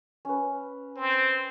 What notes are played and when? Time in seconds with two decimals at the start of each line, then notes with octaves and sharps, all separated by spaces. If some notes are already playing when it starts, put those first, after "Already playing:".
0.25 C#4 B4
0.96 C4